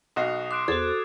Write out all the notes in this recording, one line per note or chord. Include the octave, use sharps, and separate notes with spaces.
B1 F#4 D#5 D#6 C7
C6 D6 F#6 D7
E2 F#4 A4 C5 G#6 A6